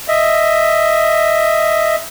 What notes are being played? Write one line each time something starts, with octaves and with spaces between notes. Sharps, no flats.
D#5 E5